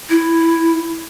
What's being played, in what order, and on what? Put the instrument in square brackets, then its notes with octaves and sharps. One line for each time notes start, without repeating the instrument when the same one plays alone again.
[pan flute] E4